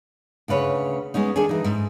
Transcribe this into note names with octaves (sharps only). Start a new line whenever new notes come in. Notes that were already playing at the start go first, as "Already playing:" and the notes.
D2 C#3 B4 C#5
G#3 B3 C#4 D#4
D#3 D4 G#4 A4 G#5
E3 D#4
G#2